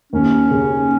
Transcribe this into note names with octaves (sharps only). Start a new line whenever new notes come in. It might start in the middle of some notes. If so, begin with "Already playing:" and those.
D#2 C#4
C#3